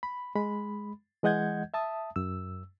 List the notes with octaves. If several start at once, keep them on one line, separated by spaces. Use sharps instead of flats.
B5
G#3 B5
E3 G#3 D#5 F#5 G6 G#6
E5 A5 D#6
F#2 E6